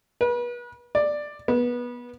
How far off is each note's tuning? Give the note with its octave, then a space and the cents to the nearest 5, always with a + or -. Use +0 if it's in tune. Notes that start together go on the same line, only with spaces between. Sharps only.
B4 -35
D5 +10
B3 -20